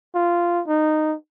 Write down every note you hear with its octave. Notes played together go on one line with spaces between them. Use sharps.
F4
D#4